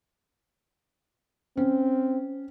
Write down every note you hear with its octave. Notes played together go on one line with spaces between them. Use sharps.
C4 C#4